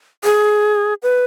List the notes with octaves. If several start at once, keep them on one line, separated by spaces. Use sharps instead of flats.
G#4
B4